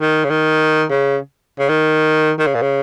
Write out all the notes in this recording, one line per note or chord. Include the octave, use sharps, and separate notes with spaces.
D#3
C#3
D#3
C#3
C#3
D#3
D#3
C#3
A#2
C#3